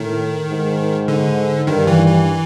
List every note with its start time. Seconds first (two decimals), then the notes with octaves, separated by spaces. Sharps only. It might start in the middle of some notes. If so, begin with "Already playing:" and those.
Already playing: A2 D#3
0.50 G#2
1.08 D3
1.67 G2 D#3
1.87 E3
2.06 E3